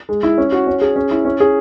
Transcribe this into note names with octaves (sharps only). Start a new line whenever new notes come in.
G#3
E4
C#4
F#4
C#4
G#4
C#4
E4
C#4
G#4